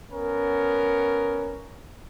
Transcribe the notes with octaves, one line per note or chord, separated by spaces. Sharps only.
B3 C#4 A#4